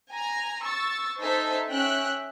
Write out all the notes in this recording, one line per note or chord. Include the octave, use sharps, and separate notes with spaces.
G#5 A#5
C#6 E6 A6
D#4 A4 C5 E5 G#5 A5
C#4 E5 G5 F#6